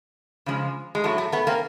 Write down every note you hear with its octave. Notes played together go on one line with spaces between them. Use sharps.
C#3 F3 G#3
G#3
A2 F#3 A3
A3
A3 B3
A#3 C4